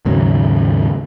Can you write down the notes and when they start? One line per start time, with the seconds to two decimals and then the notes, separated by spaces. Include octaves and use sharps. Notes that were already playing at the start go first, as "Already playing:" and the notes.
0.05 D#2 G#2 C#3 F#3